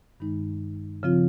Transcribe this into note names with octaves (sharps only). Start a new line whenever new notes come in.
G2 D#3 G#3 D#4
C#3 F3 C4 F4